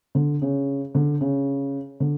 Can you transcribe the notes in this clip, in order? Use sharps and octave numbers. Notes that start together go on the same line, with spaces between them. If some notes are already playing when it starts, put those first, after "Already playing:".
D3
C#3
D3
C#3
D3